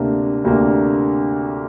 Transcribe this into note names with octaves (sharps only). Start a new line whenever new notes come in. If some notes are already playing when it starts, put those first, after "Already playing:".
Already playing: D2 C3 A#3 D4
D2 C3 A#3 D4